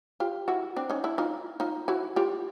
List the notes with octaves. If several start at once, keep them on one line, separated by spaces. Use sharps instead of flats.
F4 G4
E4 F#4
C4 D4
C#4 D#4
D4 E4
D#4 F4
D#4 F4
E4 F#4
F4 G4